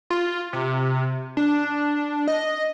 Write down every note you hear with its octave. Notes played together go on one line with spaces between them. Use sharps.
F4
C3
D4
D#5